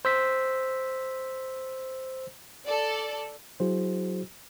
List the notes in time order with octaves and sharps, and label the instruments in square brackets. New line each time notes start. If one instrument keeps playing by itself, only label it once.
[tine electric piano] C5 E6 B6
[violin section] A4 D5
[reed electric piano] F#3 E4 F#4 G#4 C5